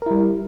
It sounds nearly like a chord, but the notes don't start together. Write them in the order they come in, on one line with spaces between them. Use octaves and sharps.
A#4 E4 G3